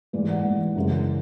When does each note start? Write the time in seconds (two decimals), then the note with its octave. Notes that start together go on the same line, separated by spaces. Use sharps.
0.13 G#2 E3 G#3 B4 D5
0.29 D5 F#5
0.45 G#2 E3 G#3
0.76 F#2 C#3 E3 G#3